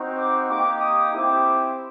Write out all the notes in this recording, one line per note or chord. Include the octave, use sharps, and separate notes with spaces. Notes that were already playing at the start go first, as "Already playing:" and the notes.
Already playing: C4 D#4 F#4
D6
A#3 D#4 G4 D6
D#6
C4 E4 G4 D6